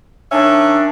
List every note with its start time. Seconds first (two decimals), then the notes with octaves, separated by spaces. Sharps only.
0.31 D#3 C#4 D4 E5